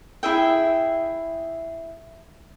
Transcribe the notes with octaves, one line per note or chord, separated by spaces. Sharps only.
E4 G#4 E5 G5